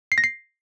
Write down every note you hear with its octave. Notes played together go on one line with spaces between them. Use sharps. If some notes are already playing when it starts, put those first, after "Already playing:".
C7
A#6
C7